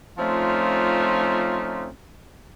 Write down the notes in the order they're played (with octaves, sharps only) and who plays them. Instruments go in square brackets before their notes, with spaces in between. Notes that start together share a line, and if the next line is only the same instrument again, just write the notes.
[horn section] F3 A3 C4 C#4 D#4 F4